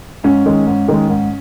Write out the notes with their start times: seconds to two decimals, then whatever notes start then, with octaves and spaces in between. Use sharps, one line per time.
0.24 G#2 C#4
0.46 D#3 G#3
0.67 G#2
0.88 D#3 G#3
1.09 G#2